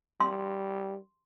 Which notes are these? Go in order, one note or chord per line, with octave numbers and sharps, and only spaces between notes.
G3 C6